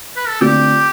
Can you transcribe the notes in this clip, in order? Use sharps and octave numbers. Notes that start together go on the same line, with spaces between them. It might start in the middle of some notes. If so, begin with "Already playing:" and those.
B4
A4
D3 A3 C4 F4 G4